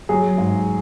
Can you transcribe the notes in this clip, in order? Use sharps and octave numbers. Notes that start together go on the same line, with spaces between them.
F#3 G#4
G#2